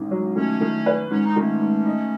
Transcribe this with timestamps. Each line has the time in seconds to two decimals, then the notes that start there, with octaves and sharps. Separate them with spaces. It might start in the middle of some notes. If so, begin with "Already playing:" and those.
Already playing: A1 G#2 D#3
0.11 F#3
0.36 D#3 A3 C#4
0.61 D#3
0.86 B4
1.10 G#2 C#4
1.25 D#4
1.36 D#3 A3 C#4
1.61 G#2
1.86 D#4